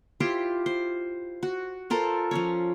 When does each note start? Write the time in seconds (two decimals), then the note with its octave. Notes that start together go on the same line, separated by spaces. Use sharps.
0.20 E4 F4 G4 C5
0.66 C5
1.43 F#4
1.90 F4 A4 A#4 C5
2.31 F3 C#4 C#5